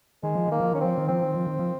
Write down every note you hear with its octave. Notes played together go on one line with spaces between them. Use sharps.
D#3 G#3
F3
D#3 A#3
F3
D#3 C#4
F3 C4
D#3
F3 C4
D#3
F3
D#3
F3